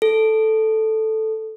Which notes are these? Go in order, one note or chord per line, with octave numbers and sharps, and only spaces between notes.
A4